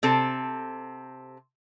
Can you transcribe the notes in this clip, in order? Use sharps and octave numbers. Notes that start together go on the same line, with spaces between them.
C3 C4 A4